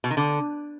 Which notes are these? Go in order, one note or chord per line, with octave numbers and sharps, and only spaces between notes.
B2
D#3
D3